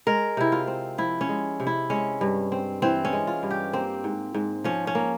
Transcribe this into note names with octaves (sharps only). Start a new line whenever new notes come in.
G#3 A#4
C3 E4
F4
C4
F3 E4
C#4
G#3
C3
E4
G#3 C#4
G2
C4
E3 C4
C#4
G#3
F4
G2
G4
A#3 C4
G#2
G#2
F3 C#4
C#4
A#3